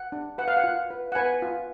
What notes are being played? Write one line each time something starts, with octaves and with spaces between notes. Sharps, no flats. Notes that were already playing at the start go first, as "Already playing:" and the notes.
Already playing: F#5
D4
B4 F#5
F5
F#5
F4
B4
F#5
B4 G#5
F4